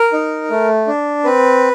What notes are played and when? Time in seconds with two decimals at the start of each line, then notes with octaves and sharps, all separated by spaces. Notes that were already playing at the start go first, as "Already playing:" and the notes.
Already playing: A#4
0.13 D#4
0.50 A3
0.87 D4
1.24 C4 B4